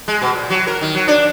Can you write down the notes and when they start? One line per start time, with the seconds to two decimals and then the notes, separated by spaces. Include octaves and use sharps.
0.08 G#3
0.22 B2
0.35 A#2
0.50 F#3
0.67 A#4
0.81 D#3
0.94 F#3
1.08 D4